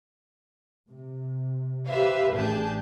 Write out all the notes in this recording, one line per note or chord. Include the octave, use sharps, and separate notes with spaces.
C3
G4 B4 C5 E5 F5
A1 D4 G4 G#4 A5 G6